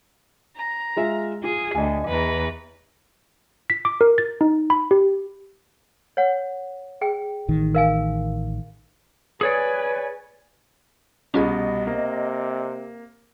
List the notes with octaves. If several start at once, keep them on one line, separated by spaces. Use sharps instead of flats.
A#5
G#3 F4 E5
F4 G#4
D2 D#5 G#5
E2 B4 A#5
B6
D6
A#4
A6
D#4
B5
G4
C#5 F#5
G#4 G5
A1 D#3
A#4 F5 G#5
G#4 B4 C#5 D5 G#5
C2 B2 C#4 F4 G#4 D#5
C3 A#3